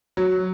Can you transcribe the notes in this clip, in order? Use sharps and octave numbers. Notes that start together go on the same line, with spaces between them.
F#3